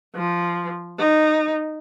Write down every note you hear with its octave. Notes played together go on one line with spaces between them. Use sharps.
F3
D#4